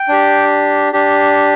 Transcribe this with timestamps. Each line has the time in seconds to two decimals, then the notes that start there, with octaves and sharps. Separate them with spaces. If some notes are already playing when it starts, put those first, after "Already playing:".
Already playing: G5
0.08 D4 G4
0.93 D4 G4